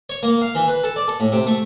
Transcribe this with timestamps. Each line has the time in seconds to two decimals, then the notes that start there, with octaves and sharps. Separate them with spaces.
0.10 C#5
0.23 A#3
0.41 F5
0.55 E3
0.68 B4
0.84 A4
0.96 D5
1.08 A4
1.20 A2
1.32 C3
1.47 A3